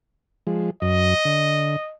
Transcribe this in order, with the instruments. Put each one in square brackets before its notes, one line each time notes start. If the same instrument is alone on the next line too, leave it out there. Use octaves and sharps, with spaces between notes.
[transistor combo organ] F3 G#3
[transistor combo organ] F#2 [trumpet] D#5
[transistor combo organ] D3